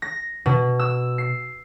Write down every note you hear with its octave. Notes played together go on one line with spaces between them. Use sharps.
A#6
B2
E6
C7